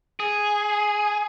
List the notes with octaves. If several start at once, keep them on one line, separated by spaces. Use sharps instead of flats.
G#4